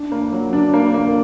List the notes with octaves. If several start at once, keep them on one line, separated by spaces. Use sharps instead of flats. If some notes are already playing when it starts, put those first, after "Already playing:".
Already playing: D4
A#3
F#3
D4
A#3
A#3